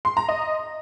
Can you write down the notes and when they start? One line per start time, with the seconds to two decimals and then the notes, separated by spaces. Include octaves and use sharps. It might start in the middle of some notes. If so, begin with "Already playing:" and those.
0.05 C6
0.17 A#5
0.29 D#5